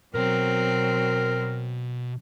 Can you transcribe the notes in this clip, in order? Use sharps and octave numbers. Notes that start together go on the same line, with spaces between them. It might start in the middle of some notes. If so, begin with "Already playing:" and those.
B2 F#3 C4 A#4 A#5